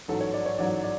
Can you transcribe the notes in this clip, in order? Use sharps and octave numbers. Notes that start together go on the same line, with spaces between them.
A1 G#2 F#3 A4
C#5
D5
C#5
A1 G#2 F#3 D5
D5